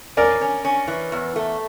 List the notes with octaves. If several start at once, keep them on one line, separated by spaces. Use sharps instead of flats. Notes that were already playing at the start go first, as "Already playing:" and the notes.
C#4 A#4 D5
C#4
C#4
E3
E2
A3